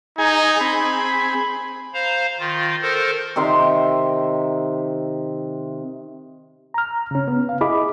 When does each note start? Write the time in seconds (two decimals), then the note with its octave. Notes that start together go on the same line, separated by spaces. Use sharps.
0.18 D#4 G#4 G#5
0.61 C4 G#4 B5
1.94 C5 F5 A#5
2.39 D#3 F4
2.82 A4 A#4 C5
3.36 C3 D#3 E5 C6
6.74 A#5 F6
7.11 C#3 C#4
7.28 B3
7.49 F5
7.61 E4 G#4 D#5 B5 D6